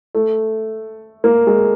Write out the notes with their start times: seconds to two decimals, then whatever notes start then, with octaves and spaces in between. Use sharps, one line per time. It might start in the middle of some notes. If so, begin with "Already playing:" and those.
0.15 A3
1.24 A#3
1.47 G#3